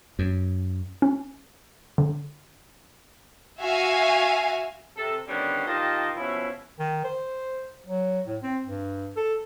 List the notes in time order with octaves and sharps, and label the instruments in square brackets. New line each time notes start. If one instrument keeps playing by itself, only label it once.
[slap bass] F#2
[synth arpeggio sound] C#4
D3
[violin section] F#4 E5 F5 G#5
[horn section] C3 A4
D3 D#3 F3 G3 B3 C#4
D#3 F4 G4 D#5 A5
B2 F3 C#4 E4
[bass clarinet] D#3
C5
F#3
A2
C4
G2
A4